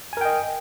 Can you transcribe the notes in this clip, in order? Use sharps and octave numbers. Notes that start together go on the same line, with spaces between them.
A#4 D#5 G5 G#5